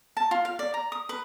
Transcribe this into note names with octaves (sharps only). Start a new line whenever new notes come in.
A5
F4
F5
D5
A#5
D#6
B4